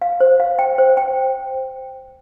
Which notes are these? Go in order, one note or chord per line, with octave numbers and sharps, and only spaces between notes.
F5
C5
F5
G5
C5
G5